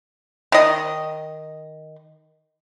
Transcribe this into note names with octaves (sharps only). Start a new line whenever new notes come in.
D#3 D#5